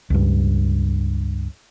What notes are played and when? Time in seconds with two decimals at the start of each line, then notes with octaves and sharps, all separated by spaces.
0.10 C#2 G2